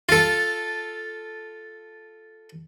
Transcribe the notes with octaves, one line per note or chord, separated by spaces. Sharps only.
F4 A4